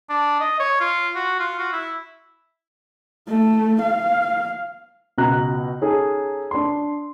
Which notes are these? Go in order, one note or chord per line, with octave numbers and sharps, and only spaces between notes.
D4
D#5
C#5
F4
F#4
F4
F#4
E4
A3
F5
C#2 B2 A#5 F#6
C#4 D#4 G#4 A4
D4 C6